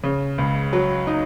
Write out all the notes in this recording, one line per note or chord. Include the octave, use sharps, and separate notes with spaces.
C#3
C#2
F#3
D#4